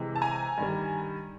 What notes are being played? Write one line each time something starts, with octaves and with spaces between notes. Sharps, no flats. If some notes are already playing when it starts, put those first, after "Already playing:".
Already playing: C3 E3 G#3
A5
G#5 A#5
G2 D#3 G3